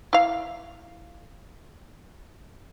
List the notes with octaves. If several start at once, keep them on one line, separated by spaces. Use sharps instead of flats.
E4 F5